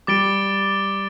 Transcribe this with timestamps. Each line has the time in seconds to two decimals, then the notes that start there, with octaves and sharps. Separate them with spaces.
0.07 G3 D6 A6 D7 G7